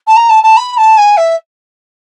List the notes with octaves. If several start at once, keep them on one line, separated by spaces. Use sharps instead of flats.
A5
A#5
A5
A5
B5
A5
G#5
E5